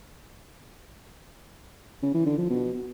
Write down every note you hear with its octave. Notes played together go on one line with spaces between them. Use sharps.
C#3
E3
D3
F3
B2